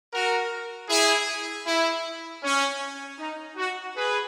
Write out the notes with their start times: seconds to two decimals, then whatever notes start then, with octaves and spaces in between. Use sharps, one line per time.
0.12 F#4 A#4
0.89 E4 G#4
1.66 E4
2.43 C#4
3.19 D#4
3.57 F#4
3.96 G#4 B4